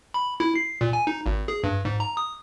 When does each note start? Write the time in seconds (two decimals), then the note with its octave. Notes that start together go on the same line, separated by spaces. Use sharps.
0.14 B5
0.40 E4
0.55 C7
0.81 A#2
0.93 G#5
1.07 D#4
1.26 G#1
1.48 G#4
1.64 G2
1.85 G#2
2.00 A#5
2.17 D#6